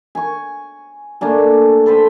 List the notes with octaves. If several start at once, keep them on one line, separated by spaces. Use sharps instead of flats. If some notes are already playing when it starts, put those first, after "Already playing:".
G#5 C#6
A3 A#3 D4 G#5
A4 B4 C5 G5